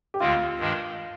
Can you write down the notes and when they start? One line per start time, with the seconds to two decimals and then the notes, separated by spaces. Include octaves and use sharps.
0.14 G4
0.20 D2 D3 G#3 C4 F4
0.59 G2 D#3 G#3 D4